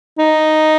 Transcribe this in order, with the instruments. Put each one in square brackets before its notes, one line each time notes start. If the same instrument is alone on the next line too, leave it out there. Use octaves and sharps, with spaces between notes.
[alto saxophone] D#4